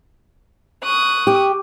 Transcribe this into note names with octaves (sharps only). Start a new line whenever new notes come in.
C#6 D#6 F#6
G4